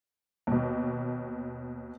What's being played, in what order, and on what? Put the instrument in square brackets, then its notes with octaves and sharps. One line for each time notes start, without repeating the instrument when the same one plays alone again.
[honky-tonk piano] D#2 B2